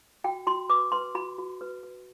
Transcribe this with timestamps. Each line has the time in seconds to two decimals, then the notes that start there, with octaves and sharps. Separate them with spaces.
0.24 F#4 G5
0.47 F#4 C6
0.69 B4 D6
0.92 B4 C6
1.15 F#4 B5
1.38 F#4
1.61 B4
1.83 B4